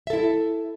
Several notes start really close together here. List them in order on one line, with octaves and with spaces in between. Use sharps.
E5 A4 E4